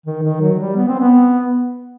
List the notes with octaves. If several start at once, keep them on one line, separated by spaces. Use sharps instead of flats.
D#3
D#3
F#3
G3
B3
C4
B3